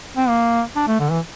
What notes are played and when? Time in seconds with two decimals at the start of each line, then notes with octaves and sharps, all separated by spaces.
0.17 C4
0.29 A#3
0.76 D4
0.88 A3
1.00 D3
1.11 E3